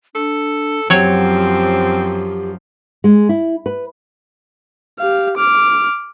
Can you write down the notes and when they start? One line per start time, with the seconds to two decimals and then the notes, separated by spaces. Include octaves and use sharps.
0.15 D4 A4
0.90 F#2 F3 F#3 C4 G4 C#5
3.04 G#3
3.29 E4
3.66 B4
4.99 G4 F5
5.37 D6 F6